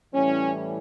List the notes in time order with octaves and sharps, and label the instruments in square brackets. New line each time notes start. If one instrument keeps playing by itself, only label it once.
[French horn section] A2 E3 G3 C#4